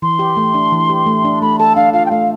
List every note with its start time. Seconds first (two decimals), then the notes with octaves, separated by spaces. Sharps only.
0.02 E3 C6
0.19 G4
0.37 A3
0.54 D4
0.72 E3
0.90 G4
1.06 A3
1.25 D4
1.42 A3 B5
1.59 A4 A5
1.76 D4 F5
1.93 F4 F5
2.06 G5
2.11 A3 F5